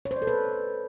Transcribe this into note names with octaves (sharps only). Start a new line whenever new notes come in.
C#5
C5
D5
A4
B4